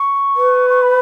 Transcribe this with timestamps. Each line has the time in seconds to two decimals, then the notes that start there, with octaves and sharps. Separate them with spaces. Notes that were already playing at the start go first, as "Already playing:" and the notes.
Already playing: C#6
0.36 B4
0.70 C#6
0.82 B5